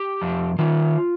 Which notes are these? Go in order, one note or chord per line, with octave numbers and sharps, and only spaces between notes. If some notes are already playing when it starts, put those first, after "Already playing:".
Already playing: G4
F2
D#3 F4